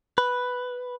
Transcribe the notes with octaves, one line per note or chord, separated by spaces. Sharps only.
B4